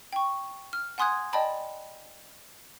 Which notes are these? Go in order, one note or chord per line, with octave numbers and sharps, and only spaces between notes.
G5 C#6
F6
F#5 G#5 C6 D#6 F#6 G#6
D5 D#5 G5 A5 B5